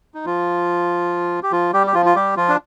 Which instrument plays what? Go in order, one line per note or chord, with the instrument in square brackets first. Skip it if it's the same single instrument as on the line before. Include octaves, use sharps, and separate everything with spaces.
[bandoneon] D#4
F3 F4
G4
F3 F4
G3 G4
G4
F3 F4
F4
G3 G4
F3 F4
D4